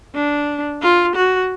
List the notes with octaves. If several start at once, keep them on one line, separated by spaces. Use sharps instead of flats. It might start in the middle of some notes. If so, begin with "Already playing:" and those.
D4
F4
F#4